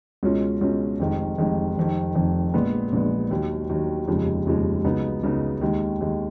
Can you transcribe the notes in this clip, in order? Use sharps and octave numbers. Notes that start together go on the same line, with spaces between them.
C#2 B2 G#3 C#4 F4
C#2 B2 G#3 C#4 F4
F1 F2 D#3 G#3
F1 F2 D#3 G#3
F1 F2 D#3
F1 F2 D#3
A#1 A#2 G#3 B3
A#1 A#2 G#3 B3
D#2 D#3 F#3
D#2 D#3 F#3
F1 D#2 C#3 F3 G#3
F1 D#2 C#3 F3 G#3
C#2 C#3 F#3 B3 D#4
C#2 C#3 F#3 B3 D#4
D#2 D#3 G#3
D#2 D#3 G#3